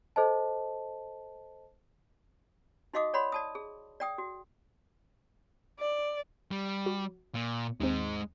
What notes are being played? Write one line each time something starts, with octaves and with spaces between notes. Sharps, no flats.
A4 C5 D#5 A5
D#4 F#4 D#5 F5 D6 D#6
C#5 D5 F#5 B5 C6
D5 A5 D#6
G#4
D5 G5 D#6
F#4
D5
G3
F#4
A#2
D#2 G#3 C4 D#4